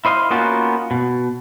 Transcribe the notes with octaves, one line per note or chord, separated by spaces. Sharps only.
E4 C5 D#5 F5
A#3 B3 C#4 D#4 F4 F#4
B2